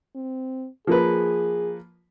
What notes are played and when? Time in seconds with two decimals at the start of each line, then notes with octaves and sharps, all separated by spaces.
0.15 C4
0.87 F3 A#3 G#4 B4